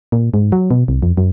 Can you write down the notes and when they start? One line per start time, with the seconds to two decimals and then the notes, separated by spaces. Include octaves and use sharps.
0.12 A#2
0.34 G#2
0.52 F#3
0.71 B2
0.88 C2
1.03 F2
1.17 F#2